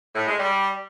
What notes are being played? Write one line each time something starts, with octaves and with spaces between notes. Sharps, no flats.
A2
G#3
G3